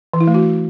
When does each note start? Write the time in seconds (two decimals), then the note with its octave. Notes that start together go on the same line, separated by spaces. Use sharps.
0.14 E3
0.20 E4
0.27 A3
0.34 F#4